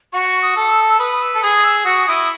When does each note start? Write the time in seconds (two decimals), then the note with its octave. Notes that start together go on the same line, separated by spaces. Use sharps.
0.13 F#4 C#6
0.42 D#6
0.56 A4
0.71 E6
0.90 E6
0.99 B4 D#6
1.22 E6
1.35 A4
1.42 G#4 D#6
1.64 E6
1.85 F#4 D#6
2.07 E4 D#6